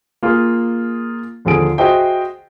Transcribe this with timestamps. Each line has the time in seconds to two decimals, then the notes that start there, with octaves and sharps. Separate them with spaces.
0.23 A#3 F4 G#4
1.45 D#2 D3 F3 G#4 D7
1.78 F#4 G#4 C5 D#5 E5 G5